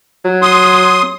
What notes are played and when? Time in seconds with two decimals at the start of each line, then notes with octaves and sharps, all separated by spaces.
0.25 F#3
0.42 C6 D#6